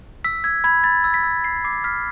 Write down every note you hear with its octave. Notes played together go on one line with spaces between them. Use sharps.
E6 B6
E6 G#6
B5 G#6
B5 A6
E6
B6
E6
B5 C7
D6 C7
F6 B6